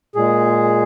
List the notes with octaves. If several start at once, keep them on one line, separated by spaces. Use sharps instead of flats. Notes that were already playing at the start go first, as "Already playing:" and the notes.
A#2 G#3 G#4